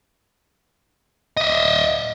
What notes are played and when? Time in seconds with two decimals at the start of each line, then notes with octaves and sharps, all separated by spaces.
1.37 D#5 E5